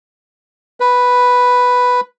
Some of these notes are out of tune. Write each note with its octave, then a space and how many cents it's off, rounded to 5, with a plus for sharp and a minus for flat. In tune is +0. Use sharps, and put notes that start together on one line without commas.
B4 +0